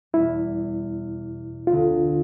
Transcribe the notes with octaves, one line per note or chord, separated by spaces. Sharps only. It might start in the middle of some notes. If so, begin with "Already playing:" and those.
E2 B2 G3 E4
D2 D3 A3 C4 F4